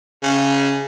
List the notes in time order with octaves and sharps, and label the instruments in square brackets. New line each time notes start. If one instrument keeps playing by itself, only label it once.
[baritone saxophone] C#3